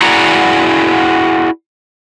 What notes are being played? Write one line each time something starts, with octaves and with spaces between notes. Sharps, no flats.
E4 F#4 G#4 D5 F#5 A#5